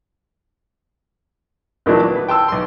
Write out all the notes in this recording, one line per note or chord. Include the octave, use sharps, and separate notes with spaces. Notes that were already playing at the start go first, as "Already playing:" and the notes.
D2 A#2 D#3 E3 F#3 D4
B3
B4
G5 A5 C6 E6
B1 C6